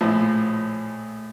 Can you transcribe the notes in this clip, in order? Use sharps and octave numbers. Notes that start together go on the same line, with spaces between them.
A#1 A2 F3